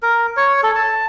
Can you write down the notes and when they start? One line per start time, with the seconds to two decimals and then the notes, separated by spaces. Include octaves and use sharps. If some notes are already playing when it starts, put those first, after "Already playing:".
0.03 A#4
0.37 C#5
0.63 A4
0.75 A5